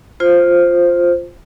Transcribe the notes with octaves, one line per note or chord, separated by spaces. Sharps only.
F4 C5